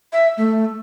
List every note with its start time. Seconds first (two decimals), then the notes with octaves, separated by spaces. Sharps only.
0.13 E5
0.37 A3